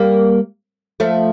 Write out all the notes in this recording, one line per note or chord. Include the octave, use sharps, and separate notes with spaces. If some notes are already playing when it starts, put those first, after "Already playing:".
Already playing: G3 A#3
F3 A3